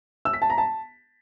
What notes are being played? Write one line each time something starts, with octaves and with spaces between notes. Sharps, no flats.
E6
B6
A5
A#5
A5